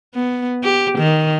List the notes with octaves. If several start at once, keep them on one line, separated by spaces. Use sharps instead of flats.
B3
G4
D#3